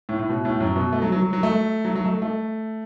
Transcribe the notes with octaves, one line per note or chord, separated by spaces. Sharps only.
A2
A2
B2
A2
F#2
B2
A3
F#3
F#3
F#3
F#3
A3
F#3
F#3
A3
A3